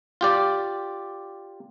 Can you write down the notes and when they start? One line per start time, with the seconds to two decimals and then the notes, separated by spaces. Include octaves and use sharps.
0.21 F4 G4 D5